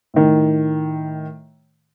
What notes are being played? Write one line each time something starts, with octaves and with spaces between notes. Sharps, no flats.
A2 D#3